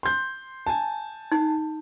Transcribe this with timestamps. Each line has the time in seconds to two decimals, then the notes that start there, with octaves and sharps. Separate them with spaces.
0.03 C6 G6
0.67 G#5 A5
1.32 D#4